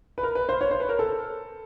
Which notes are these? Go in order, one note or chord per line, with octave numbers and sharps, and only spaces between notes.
B4
A#4
B4
C5
C#5
C5
B4
A#4
A4